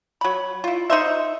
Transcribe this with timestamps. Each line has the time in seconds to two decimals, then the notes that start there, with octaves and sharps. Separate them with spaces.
0.21 F#3 B5
0.64 E4 F4
0.90 D#4 C5 E5